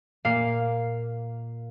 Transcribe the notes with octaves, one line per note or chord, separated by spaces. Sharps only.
A#2 A#3 F5 C7